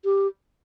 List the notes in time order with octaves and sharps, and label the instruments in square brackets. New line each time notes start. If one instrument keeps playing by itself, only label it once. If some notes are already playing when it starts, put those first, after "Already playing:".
[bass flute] G4